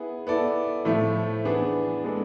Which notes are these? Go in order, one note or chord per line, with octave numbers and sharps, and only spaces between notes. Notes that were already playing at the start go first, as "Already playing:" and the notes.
Already playing: B3 E4 G#4
B3 E4 A4 D5
A2 F3 A3 E4
E3 B3 D4 G#4
G#3 B3 D4 A4